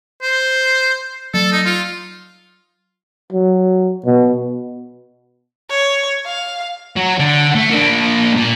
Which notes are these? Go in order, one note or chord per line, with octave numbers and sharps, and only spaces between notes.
C5
F#3 A4
D#4
F4
F#3
B2
C#5
F5
F#3
D3
A3
A#3 D4
A#2